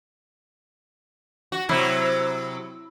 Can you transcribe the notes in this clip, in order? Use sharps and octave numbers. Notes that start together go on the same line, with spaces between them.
F#4
C3 F#3 E4